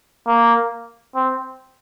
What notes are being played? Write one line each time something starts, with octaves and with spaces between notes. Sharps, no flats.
A#3
C4